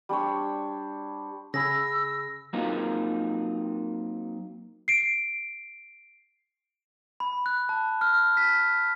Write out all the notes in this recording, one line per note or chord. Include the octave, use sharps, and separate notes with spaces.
G3 D4 C5 C#5
C#3 G#4 B5 E6 A#6
F#3 A#3 C4 D#4 F4 A#4
C7 D7
B5
F#6
A5
F6
B6